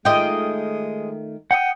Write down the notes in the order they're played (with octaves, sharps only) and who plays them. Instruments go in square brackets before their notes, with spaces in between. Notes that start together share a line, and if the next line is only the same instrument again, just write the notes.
[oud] D#3 A3 F4 [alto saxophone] G#3 [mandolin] D#5 G5
[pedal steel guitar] F#5 D#6 [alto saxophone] G5